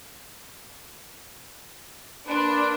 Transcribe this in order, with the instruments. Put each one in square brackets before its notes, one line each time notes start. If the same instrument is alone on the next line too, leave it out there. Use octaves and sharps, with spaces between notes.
[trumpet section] A#3 B4 C6 [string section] D4